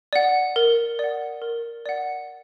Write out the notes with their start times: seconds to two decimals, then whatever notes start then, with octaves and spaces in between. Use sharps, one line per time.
0.13 D5 F#5
0.56 A#4
0.99 D5 F#5
1.42 A#4
1.86 D5 F#5